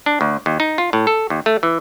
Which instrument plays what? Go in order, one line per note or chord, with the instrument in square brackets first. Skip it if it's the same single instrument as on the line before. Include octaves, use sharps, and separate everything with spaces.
[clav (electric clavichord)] D4
D2
D#2
D#4
F4
A2
A4
D#2
A3
E3